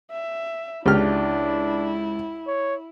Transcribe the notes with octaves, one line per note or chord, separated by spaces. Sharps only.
E5
C#2 D4 E4 G4 F6
C#5